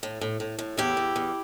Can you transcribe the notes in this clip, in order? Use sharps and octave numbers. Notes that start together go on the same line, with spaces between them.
A2
A2
A2
A2
E2 E4 G4
E2
E2